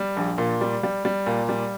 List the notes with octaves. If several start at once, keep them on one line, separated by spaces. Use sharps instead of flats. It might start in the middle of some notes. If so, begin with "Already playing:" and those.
Already playing: G3
A#1
A#2
G3
G3
G3
A#2
G3